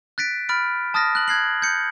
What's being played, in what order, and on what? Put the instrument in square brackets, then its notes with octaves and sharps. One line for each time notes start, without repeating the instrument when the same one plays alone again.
[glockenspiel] F#6 A6 B6 D7
B5 F6 A6 D7
A5 D#6 F6 A6 A#6
F#6 F#7
F#6 G#6 C7 F#7
G6 C#7